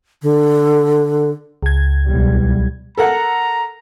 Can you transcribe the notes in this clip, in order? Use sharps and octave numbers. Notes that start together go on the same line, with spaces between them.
D3
C#2 G#6
B1 E2 G3
A4 A#4 F#5 A#5